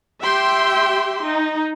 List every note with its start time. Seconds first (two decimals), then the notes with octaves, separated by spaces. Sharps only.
0.21 G4 E5 G5 C6
1.25 D#4